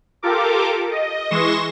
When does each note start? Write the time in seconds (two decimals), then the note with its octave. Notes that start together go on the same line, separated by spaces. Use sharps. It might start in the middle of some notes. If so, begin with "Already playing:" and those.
0.23 F4 G4 A4 A#4 D6
0.91 D#5
1.30 E3 G#3 C6 C#6 A#6 E7